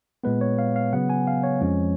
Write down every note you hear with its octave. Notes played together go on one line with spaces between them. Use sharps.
A#2 G#3 B3 B4
C#5
F5
F5
C#3 F#3 B3 F#5
G#5
F5
C#5
F2 F3 G#3 C#4